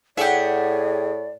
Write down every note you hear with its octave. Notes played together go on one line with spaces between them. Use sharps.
A2 G4 G#4 D5 E5 F#5